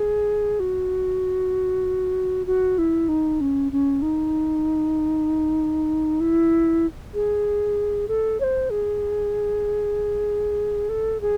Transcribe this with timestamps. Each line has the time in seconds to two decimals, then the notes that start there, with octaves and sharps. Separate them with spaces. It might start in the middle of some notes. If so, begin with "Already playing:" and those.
Already playing: G#4
0.60 F#4
2.46 F#4
2.78 E4
3.08 D#4
3.41 C#4
3.72 C#4
4.02 D#4
6.20 E4
7.14 G#4
8.08 A4
8.40 C#5
8.43 C5
8.70 G#4
10.89 A4
11.21 G#4